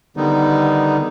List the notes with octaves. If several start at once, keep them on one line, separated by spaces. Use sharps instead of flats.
D3 D#3 G3 B3 D#4